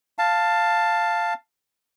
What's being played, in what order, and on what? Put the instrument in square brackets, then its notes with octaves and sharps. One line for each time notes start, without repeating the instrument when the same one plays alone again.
[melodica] F5 A5